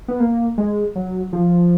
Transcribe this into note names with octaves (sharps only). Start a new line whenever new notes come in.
B3
A#3
G#3
F#3
F3